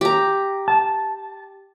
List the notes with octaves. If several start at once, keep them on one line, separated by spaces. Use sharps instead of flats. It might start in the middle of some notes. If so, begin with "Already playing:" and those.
G4 A#5
A5